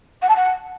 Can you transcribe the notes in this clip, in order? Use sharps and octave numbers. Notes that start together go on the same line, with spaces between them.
F#5
A5
F#5